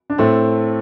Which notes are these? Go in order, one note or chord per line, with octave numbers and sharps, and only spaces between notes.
D4
A2 A3 C4